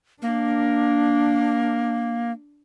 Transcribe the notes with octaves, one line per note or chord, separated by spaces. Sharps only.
A#3 D4